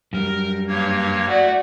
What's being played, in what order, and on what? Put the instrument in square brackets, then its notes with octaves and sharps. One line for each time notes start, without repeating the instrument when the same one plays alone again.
[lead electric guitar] F#2 G3 [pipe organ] A#4
[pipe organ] G2 A#3 C#5
[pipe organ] A3 [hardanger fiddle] F#4 D5